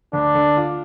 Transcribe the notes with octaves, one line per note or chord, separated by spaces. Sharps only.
D2 D4
D3
F4